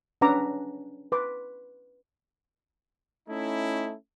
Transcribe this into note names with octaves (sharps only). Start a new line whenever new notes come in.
C#4 D4 B4 F#5 A#5 D6
B4 C6 D6
A3 C#4 D#4 E4